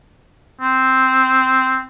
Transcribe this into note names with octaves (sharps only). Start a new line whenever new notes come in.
C4